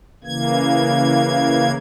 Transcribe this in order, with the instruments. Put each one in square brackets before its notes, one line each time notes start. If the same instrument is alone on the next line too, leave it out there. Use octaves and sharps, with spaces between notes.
[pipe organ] C#3 E3 A#3 G#6